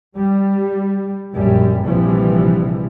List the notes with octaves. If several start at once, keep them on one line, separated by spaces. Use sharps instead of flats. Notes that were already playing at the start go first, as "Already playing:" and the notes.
G3
A#1 F#2 G3
A#1 C3 E3 F3 G3